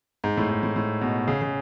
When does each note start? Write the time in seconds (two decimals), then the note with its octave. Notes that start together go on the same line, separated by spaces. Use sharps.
0.24 G#2
0.37 A2
0.50 G#2
0.63 A2
0.76 A2
1.01 B2
1.28 C#3
1.42 C#3